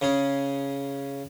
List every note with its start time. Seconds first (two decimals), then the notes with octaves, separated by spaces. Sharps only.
0.02 C#3 C#4 G#4